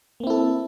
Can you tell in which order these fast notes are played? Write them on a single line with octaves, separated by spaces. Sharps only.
A#3 C4 E4 A4